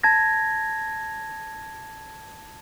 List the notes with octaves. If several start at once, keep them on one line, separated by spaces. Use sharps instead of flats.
A5 G#6 A#6